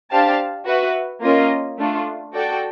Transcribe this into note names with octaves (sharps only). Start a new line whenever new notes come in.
D4 G4 C5 F5 A5
F#4 B4 E5
A#3 C#4 F4 A#4 D#5
A3 D4 F4
F#4 A4 D5 G5